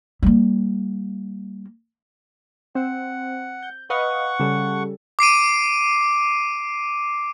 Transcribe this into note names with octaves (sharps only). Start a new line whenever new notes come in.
G3 A#3
C4 F#5
G6
B4 D#5 F5 F#5 C#6
C#3 G3 A4
D6 C7 D7 D#7